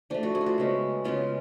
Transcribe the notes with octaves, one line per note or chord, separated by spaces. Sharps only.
F3 A3 D4
F#4
G#4
F4
F#4
C#3 G#3 B3
C#3 G#3 B3 F4